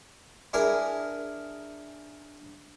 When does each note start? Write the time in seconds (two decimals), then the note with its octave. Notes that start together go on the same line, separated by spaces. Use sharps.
0.53 D4 E4 G#4 A#4 G#5 A#5